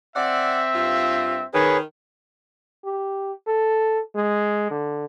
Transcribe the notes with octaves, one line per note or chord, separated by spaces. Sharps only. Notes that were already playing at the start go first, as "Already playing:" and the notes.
C4 D5 E5 F#5
G2 F4
D#3 G#4 B4 C#5
G4
A4
G#3
D3